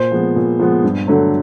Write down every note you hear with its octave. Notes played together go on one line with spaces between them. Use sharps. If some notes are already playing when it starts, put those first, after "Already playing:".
Already playing: A#2 C5
F3 G#3 B3
A#2
F3 G#3 B3
G2
D3 F#3 A3